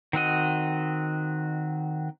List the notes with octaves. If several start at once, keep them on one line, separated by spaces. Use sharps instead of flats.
D#3 C4 F#4 D#5